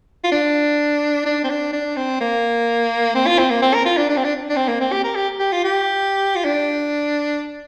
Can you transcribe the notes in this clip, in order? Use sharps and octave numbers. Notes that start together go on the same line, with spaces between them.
F4
D4
D4
C4
D4
D4
C4
A#3
C4
F4
C4
A#3
C4
A#4
F4
D4
D4
C4
D4
D4
C4
A#3
C4
G4
A#4
G4
G4
F4
G4
F4
D4